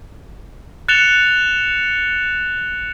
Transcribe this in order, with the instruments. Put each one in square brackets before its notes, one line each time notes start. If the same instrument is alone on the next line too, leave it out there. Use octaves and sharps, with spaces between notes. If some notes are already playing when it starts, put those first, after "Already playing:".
[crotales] F#6 A6 C#7 E7 F7 G7